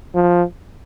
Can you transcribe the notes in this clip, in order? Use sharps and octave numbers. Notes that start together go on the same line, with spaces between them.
F3